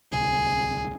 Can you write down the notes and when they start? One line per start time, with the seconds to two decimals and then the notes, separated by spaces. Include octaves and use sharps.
0.12 D1 C2 G#4